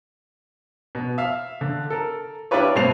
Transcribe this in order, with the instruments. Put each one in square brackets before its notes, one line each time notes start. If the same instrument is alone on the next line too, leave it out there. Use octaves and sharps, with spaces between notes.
[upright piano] B2
E5 F5
D3
A4 A#4
D4 E4 F4 G4 B4 C#5
G2 B2 A3 C4 C7 F7